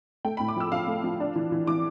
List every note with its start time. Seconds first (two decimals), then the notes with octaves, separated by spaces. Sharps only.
0.25 A3 G5
0.37 A2 B5
0.48 D6
0.57 F3 E6
0.72 F3 F5
0.88 A3
1.04 F3
1.20 D4
1.36 E3
1.52 E3
1.67 E3 D6